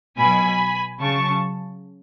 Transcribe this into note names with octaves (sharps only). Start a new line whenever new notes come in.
B2 F#3 G#5 B5
C#3 F#3 A5 C#6